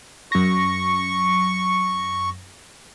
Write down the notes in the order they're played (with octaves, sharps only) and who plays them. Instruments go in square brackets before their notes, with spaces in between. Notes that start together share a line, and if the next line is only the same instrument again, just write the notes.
[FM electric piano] F#2 A#6 [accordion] C#6